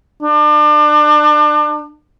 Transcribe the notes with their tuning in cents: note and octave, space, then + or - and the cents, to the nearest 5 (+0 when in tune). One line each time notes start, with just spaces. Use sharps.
D4 +30